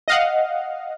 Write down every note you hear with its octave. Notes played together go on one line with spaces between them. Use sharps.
D#5 F5 F#5